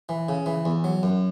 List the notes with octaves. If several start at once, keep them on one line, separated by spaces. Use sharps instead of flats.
E3
C#3
E3
E2
F#3
F#2